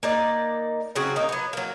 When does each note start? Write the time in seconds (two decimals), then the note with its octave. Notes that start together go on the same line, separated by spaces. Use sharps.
0.03 A#3 D#4 D5
0.95 C#3 F#3 C4 F#4
1.16 A#3 D#4
1.29 F#3 B3
1.53 F#3 A#3